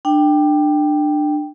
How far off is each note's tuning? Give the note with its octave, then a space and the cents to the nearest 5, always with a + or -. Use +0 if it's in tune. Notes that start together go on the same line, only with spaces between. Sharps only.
D4 +25 G5 +0